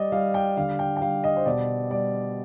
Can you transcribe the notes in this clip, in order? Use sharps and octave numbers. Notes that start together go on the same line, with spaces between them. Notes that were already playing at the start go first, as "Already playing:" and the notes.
Already playing: G3 D5 D#5
G3 F5
G5
D3 F5
G5
G5
G3 F5
D#5
C5
B2 D5
G3 D5